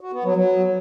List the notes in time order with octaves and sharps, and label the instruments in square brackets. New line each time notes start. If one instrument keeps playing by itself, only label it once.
[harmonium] F#4
B3
F#3
F#3